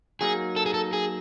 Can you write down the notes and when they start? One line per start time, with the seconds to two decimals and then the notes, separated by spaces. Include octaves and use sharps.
0.21 F#3 A#3 D#4 G#4
0.56 A4
0.66 G#4
0.74 A4
0.93 G#4